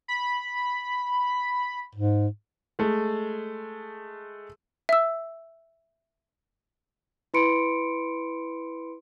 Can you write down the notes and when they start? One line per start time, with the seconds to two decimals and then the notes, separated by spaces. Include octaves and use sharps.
0.08 B5
1.95 G#2
2.79 G#3 A3
4.89 E5 E6
7.34 E4 B4 B5 C6 C#7 D7